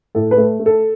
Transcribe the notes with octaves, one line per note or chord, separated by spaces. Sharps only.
A2 A4
B4
A3
A3
A4